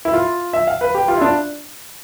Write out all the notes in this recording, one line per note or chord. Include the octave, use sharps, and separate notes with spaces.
E4
F4
E5
F5
B4
G4
F4
E4
D4